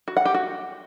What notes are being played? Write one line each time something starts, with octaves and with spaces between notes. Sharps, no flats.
F#4
F#5
G4
F#4